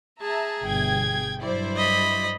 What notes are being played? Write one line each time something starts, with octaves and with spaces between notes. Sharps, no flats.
G#4 E5 A5 A#5
G1 B2 G5 G#6
G2 F#3 E4 C5 D5
D#5 B5